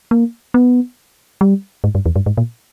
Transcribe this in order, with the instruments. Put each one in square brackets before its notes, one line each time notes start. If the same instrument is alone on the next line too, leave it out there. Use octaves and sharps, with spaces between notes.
[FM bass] A#3
B3
G3
G#2
G2
E2
G2
G#2
A#2